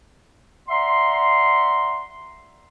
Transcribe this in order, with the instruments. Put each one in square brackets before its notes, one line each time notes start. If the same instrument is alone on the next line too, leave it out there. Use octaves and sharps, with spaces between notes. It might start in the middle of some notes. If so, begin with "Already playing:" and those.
[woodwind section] D5 E5 F#5 A#5 C6